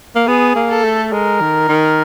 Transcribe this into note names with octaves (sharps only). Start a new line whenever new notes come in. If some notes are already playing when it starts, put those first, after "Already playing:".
A#3
B3 G#4
A#3
A4
A3
G#3 A#4
D#3
D#3